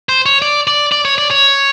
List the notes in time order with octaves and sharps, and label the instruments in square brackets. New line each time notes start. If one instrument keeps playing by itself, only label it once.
[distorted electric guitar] C5
C#5
D5
D5
D5
C#5
D5
C#5